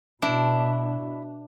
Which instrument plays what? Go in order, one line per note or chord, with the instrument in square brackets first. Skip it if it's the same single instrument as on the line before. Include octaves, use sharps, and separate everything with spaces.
[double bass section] B2 [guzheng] D4 [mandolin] E4